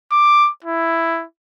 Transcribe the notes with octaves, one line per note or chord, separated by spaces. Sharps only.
D6
E4